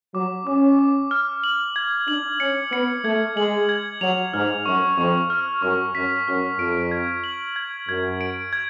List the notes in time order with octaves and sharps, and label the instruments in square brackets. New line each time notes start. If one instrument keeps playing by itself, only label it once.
[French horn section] F#3 [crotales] D6
[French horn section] C#4 [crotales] D6
[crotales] D6
F6
F#7
G#6
[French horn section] D4 [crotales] F#7
[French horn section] C#4 [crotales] C#7
[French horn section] B3 [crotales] C#7
[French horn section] A3 [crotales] G#6
[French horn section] G#3 [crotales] F#7
[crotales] G#6
[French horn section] F#3 [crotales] F7
[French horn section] G#2 [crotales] F6
[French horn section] F#2 [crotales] C#6
[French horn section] F2 [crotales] C#6
[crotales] F6
[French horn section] F#2 [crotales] C#6
[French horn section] F#2 [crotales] B6
[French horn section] F#2 [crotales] F6
[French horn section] F2 [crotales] D7
[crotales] G#6
F#7
G#6
[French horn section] F#2 [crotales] G#6
[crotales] D7
G#6